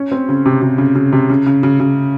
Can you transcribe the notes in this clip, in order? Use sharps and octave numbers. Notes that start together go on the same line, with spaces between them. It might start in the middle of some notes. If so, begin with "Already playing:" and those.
Already playing: C#4
C4
C#3
C3
C3
C#3
C#3
C3
C#3
C#3
C#3
C#3